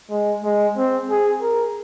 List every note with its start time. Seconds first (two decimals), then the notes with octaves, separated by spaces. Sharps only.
0.11 G#3
0.44 G#3
0.77 C4
1.10 G#4
1.42 A#4